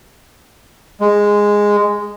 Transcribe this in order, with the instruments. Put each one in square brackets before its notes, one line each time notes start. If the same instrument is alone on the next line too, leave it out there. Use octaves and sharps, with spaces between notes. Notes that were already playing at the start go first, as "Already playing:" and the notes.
[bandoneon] G#3